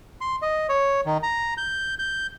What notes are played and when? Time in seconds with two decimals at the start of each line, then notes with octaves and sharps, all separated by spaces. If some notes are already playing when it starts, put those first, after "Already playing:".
0.21 C6
0.42 D#5
0.69 C#5
1.06 D#3
1.23 A#5
1.58 G6
1.99 G6